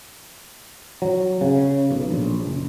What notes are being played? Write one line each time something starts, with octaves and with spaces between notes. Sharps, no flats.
F#3
C#3
B1
A#1
F#1